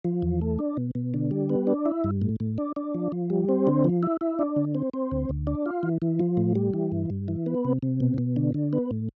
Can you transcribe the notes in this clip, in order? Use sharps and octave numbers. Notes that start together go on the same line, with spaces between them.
F3
E2
A3
D4
B2
B2
D3
G3
B3
D4
E4
G2
A2
A2
D4
D4
F3
F3
G3
C4
D3
F3
E4
E4
D4
D3
C4
C4
D2
D2
D4
F4
E3
E3
F3
A2
G3
E3
G2
G2
E3
B3
C3
C3
B2
B2
D3
D3
B3
A2